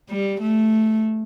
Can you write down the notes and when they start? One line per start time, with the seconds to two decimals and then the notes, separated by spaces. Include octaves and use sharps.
0.10 G3
0.41 A3